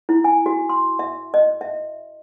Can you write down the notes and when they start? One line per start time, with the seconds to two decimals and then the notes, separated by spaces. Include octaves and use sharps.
0.09 E4
0.24 G#5
0.46 F#4
0.69 C6
0.99 E5
1.34 D#5
1.61 E5